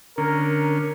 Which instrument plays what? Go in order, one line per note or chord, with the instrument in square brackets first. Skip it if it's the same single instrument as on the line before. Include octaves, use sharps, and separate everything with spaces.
[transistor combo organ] D3 C#4 [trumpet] A#4